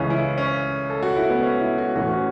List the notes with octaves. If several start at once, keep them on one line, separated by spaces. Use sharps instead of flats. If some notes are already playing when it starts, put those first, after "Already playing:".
Already playing: C#2 C#3 E3 C#4
E4
C#4
A4
F#4
E4
B3
C#4
E4
F#4
A1 A2 E3 F#4
C#4